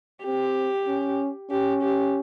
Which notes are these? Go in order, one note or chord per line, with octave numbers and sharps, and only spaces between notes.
C4 G4
C#4
C#4 G4
G4